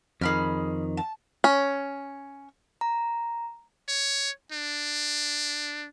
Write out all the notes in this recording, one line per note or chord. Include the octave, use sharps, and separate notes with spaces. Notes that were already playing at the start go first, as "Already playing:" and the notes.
F2 D#3 G#4 B5 F6
A5
C#4
A#5
C#5
D4